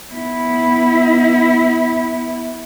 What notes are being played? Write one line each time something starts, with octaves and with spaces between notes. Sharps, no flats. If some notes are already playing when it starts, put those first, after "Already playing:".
B3 E4